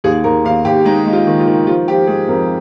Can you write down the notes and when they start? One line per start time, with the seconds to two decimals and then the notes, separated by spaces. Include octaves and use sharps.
0.04 D#2 G#4
0.24 D#2 A#4
0.44 D#2 F5
0.65 D#2 G4
0.85 G#3 D#4
1.06 G#3
1.13 F4
1.27 D#3
1.40 F4
1.47 D#3
1.67 F3 F4
1.87 F3 G4
2.07 G#3 G#4
2.28 F2 A#4